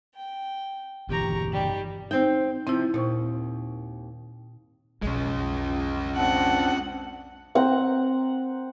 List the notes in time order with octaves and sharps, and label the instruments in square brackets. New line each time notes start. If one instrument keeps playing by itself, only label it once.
[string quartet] G5
[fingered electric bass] G1 B2 E3 [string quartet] G4 A#5 C#6
[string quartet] D#3 G3 G4
[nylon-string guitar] C4 G5 [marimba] D#4
[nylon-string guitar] C3 F3 [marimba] C4 E4
[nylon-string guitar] D#2 [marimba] A#2 C5 C#6
[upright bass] B1 F2 [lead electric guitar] G#3 C#4
[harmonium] C4 D4 [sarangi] F#5
[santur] C4 F#5 A#5